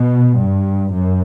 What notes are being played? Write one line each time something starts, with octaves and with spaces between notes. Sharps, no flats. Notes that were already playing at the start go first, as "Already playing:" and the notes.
Already playing: B2
G2
F#2